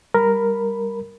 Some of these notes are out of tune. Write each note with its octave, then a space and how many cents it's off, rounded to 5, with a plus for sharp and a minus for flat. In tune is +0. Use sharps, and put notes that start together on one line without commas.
G3 +10 A#4 +0 B5 +0